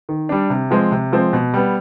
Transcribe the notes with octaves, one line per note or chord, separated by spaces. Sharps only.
D#3
G3 D4
C3
F3 G#3 C4
C3
F3 G#3 C4
B2
G3 B3